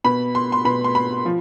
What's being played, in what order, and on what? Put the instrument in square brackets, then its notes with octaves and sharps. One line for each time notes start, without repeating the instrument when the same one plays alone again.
[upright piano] B2 B5
C6
C6
B2 B5
C6
B5
F3